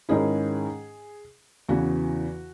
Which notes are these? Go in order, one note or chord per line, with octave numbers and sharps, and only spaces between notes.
G#2 D#3 G#3 C#4 E4 G#4
E2 C#3 E3 F#4